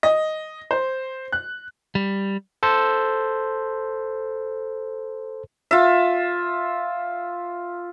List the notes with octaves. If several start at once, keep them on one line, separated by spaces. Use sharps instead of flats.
D#5
C5
F#6
G3
A4 C5
F4 E5